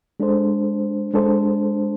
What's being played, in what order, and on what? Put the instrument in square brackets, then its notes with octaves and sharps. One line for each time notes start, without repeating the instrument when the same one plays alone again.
[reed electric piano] G#3 D4 A4 C5
G#3 D4 A4 C5